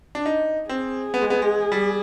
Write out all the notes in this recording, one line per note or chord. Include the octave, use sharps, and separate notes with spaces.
D4
D#4
C4 G#4
B3
G#3
B3
G#3
G3